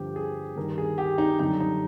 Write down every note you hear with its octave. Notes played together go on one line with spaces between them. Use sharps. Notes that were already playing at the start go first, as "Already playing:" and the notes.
Already playing: G2 D3 F3 G4
G#4
G2 D#3 G3 A#4
G#4
G4
D#4
F#2 D3 G3 D#4
D#4